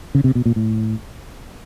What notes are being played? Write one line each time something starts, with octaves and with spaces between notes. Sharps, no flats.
C#3
C3
B2
A#2
A2